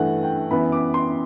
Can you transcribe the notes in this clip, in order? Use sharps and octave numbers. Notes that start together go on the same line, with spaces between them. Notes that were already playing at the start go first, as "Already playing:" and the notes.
Already playing: G2 E3 A3 F#5
G5
F#2 E3 B3 B5
D6
C6